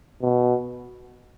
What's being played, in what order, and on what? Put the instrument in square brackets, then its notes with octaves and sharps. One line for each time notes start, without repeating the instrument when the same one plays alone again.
[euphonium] B2